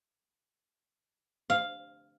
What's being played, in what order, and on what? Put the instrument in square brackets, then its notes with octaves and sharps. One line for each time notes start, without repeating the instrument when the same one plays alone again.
[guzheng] F5